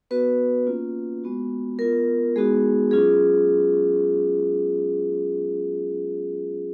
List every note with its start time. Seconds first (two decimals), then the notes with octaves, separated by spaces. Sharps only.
0.11 B3 F#4 B4
0.67 A#3 C#4 F4
1.24 G#3 B3 F#4
1.79 B3 F4 A#4
2.36 G#3 B3 D#4 F#4 G#4
2.91 F#3 C#4 F4 G#4